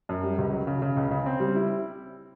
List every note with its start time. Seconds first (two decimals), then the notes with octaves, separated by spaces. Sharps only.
0.09 F#2
0.23 G3
0.38 C#2
0.52 F#3
0.67 C#3
0.82 C#3
0.97 C#2
1.11 C#3
1.26 C4
1.40 G3
1.55 E4